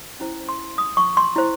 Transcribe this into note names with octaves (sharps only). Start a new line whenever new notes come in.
C#4 E4 C5
C6
D#6
C#6
C6
E4 C5